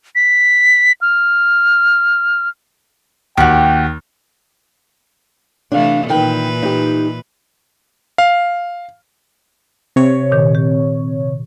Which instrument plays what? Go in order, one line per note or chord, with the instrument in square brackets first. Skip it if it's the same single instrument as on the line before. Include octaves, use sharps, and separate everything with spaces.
[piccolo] B6
F6
[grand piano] D#2 [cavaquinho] F#4 G4 [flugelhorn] G5
[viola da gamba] C3 E3 A3 [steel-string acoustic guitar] D4 F5
[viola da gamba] A#2 E3 B4 [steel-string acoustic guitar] D#3 G5
[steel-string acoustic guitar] D#4 G4
[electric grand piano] F5
[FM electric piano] C3 C#5
[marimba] A#2 D#3
G4